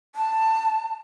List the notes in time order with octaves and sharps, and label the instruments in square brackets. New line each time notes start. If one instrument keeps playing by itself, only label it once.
[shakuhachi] A5